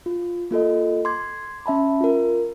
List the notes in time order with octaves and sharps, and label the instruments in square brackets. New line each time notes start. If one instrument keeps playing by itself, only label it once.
[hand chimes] F4
A#3 F4 A4 D#5
C6 D6 G#6
C#4 E5 A5 B5
F4 A#4